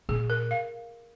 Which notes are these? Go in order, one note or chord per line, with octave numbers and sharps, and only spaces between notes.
A#2 G#4
A#4
F5